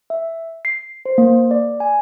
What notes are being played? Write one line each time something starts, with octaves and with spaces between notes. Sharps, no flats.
E5
C7
C5
A#3
D5
G#5